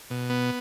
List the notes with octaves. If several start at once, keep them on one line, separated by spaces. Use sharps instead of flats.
B2
B3